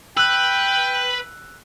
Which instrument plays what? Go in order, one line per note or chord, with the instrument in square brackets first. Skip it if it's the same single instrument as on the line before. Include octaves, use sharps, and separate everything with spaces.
[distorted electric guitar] B4 [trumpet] G5 [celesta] E6 F#6